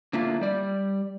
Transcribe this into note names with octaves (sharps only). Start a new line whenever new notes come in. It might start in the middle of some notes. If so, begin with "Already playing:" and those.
D3 A#3 E4 F4
G3 D5